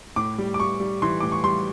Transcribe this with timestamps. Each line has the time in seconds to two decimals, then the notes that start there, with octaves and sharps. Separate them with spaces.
0.16 A2 D6
0.38 G3
0.54 D6
0.60 G3 C#6
0.80 G3
1.02 E3 C6
1.20 A2 D6
1.32 C#6
1.44 G3 C6